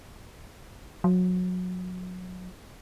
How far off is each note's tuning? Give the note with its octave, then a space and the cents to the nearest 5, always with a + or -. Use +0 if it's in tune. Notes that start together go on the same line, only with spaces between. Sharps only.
F#3 -25